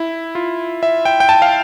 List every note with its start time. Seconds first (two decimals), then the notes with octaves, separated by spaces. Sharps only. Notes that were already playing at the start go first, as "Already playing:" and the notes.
Already playing: E4
0.35 F4
0.83 E5
1.05 G5
1.20 G5
1.29 A5
1.42 F5